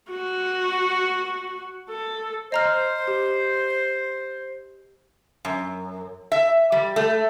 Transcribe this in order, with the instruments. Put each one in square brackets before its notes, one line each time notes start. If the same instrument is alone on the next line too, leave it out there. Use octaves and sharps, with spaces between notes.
[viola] F#4
A4
[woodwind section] C5 [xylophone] D#5 A#5 F6
[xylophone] G4
[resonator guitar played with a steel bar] F#2
E5
G3
A3